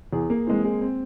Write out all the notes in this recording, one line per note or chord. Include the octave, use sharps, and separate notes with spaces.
E2 G#4
A#3
E3 G#3 C4
G#3
C4